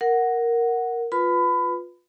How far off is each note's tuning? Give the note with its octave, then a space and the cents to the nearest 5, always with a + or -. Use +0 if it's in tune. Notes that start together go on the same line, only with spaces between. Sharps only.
A#4 +0 F#5 +0
F4 +15 B4 +0 B5 +25